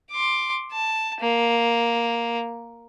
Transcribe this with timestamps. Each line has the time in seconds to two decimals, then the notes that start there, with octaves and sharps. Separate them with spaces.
0.12 C6 D6
0.72 A5
1.21 A#3